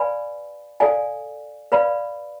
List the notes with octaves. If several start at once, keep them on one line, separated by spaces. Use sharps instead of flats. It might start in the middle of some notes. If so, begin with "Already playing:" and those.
Already playing: B4 D5 F5 G#5 B5
A4 D5 F5 G#5
B4 D5 F5 B5